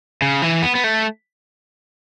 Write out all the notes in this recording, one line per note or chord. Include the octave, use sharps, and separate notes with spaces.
C#3
E3
B3
B3
A3